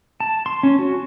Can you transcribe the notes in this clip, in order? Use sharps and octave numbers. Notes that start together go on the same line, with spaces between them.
A5
C6
C#4
F#4